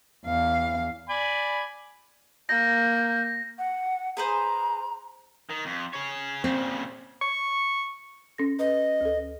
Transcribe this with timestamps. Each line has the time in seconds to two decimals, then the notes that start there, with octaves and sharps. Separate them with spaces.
0.24 E2 F5
1.09 D5 G#5 B5
2.49 A#3 G6 A#6
3.59 F#5
4.17 G#4 B4 C5 A#5
5.50 D#3
5.66 F2
5.93 G#4 C#5
6.44 A#2 C#3 C4
7.22 C#6
8.38 C#4 A4 A#6
8.59 B4 D#5
9.01 D2 A4